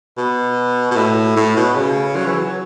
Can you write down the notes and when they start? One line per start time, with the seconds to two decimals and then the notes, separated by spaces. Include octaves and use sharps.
0.18 B2
0.91 B2
0.96 A2
1.36 A2
1.56 B2
1.76 C#3
2.16 F#3
2.26 E3
2.37 F#3